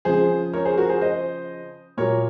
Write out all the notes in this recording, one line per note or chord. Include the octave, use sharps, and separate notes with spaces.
C#3 F3 G#4 C5
A#4 C#5
G#4 C5
F#4 A#4
G#4 C5
C5 D#5
A#2 F#3 A#4 C#5